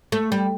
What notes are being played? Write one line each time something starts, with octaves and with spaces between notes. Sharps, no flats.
A3
G3